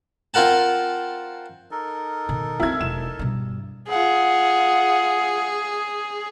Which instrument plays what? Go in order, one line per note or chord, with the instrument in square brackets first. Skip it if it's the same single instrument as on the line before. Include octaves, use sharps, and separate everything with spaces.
[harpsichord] C4 F4 A#4 F#5 A5
[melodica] D#4 A4 A#4
[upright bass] B2 D#3
[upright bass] C4 C#4 [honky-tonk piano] E4 G#6
[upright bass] E1 [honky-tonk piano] E7
[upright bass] G2 B2
[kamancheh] F4 F#5 [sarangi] G#4